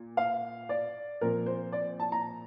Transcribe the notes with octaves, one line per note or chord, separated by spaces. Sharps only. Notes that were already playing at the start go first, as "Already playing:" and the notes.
Already playing: A#2
F5
D5
A#2 F3 C4 A#4
C5
D5
A5
A#5